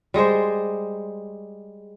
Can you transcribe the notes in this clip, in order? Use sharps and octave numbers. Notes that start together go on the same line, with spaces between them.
G3 G#3 G#4 C5